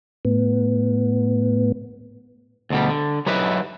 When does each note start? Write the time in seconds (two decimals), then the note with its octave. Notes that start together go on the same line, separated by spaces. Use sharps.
0.25 A2 B3
2.70 D2 B2 G3
2.89 D3
3.26 F#3 D#4 E4 G4 B4 D#5